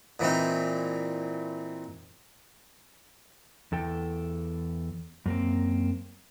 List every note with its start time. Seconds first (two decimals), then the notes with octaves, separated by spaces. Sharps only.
0.19 A#2 E3 C4 D#4
3.72 E2 A4 G5
5.26 F#2 A#3 C4